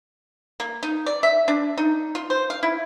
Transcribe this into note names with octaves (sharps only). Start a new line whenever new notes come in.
A#3
D#4
D5
E5
D4
D#4
F4
C5
F5
E4